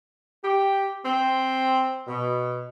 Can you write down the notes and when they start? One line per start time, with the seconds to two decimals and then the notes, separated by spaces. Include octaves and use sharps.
0.43 G4
1.05 C4
2.08 B2